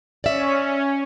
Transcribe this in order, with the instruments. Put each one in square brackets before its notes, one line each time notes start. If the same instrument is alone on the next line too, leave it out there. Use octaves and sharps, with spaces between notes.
[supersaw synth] C#4 [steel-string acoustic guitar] D5 E5